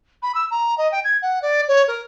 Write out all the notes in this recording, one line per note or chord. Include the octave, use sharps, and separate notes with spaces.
B5
E6
A#5
D#5
G5
G#6
F#5
D5
C#5
A#4